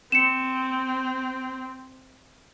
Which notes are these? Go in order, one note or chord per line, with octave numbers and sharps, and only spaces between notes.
C4 C#7 E7